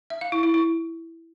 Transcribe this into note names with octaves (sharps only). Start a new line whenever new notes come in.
E5
F5
E4
E4
E4